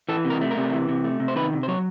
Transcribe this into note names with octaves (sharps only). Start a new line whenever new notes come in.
E3 A4
C3
A#4
A3
A#4
C3
E3
C3
A3
C3
C5
D#3 B4
C3
C5
F#3 C#5